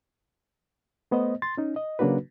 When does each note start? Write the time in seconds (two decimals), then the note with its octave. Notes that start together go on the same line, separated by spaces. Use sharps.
1.11 A3 B3 C5 D#5
1.42 C6 A6
1.57 C#4 D#4
1.76 D#5
1.99 C#3 F#3 A#3 D4 F#4 B4